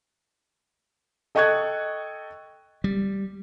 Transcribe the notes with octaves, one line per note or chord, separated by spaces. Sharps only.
A4 D#5 G5 C#6 F#6 G#6
G3